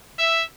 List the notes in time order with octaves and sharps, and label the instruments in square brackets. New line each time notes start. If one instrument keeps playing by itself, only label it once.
[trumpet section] E5